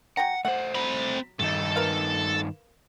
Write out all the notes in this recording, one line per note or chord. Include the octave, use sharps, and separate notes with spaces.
F#3 F#5 G5 A#5
A3 C5 F#5
F#3 C4 B5
G2 D#3 D#4 A4
A#4 B4 F5